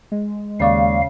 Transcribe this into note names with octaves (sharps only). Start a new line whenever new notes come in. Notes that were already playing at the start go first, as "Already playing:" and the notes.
G#3
D#2 C#3 D5 F5 C#6